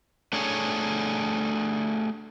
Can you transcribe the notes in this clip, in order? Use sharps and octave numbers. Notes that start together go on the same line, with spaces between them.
A3 D4 G#4 C#5